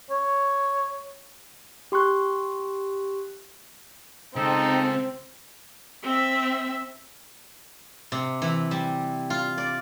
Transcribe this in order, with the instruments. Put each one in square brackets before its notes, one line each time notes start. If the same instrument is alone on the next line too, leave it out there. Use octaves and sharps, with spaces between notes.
[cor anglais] C#5
[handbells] G4 C6 C#6 F#6
[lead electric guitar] C#3 G#3 [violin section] C4 [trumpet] D#4 [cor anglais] A4
[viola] C4 E5
[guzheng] C3
E3
G3
F4
D5